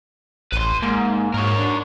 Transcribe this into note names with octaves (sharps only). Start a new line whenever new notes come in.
A1 B4 C6
G#2 A#3
G#2 A#4 C#5
D4